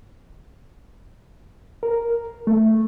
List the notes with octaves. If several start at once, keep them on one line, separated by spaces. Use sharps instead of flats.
A#4
A3